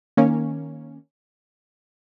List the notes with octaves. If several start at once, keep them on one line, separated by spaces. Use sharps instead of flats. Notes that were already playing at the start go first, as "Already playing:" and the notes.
D#3 A#3 C#4